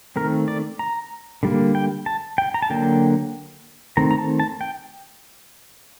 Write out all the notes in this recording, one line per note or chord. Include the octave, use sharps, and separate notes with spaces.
D#3 A3 C4 A#4
D5
A#5
D3 G3 A#3
G5
A5
G5
A#5
A5
D3 F#3 A#3 G5
D#3 A3 C4 A#5
A#5
A5
A5
G5